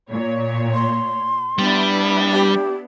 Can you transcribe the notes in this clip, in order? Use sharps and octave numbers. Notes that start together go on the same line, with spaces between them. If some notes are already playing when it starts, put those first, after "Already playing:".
A#2 C#5
C6
G3 B3 D4 E4
G4